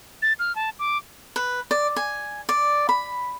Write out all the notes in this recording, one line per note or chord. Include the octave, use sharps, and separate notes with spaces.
A6
F6
A5
D6
B4
D5
G#5
D5
B5